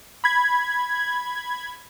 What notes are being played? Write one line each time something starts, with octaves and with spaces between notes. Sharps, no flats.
B5 G#6